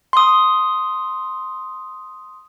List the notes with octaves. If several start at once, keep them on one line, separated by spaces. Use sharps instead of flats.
C6 D#6